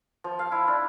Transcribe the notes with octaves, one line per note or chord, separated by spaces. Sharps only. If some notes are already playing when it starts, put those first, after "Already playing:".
F3
F5
E4
D4